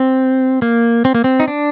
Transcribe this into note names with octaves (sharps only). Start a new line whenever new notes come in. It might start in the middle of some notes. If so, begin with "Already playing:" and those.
Already playing: C4
A#3
C4
A#3
C4
D#4
D4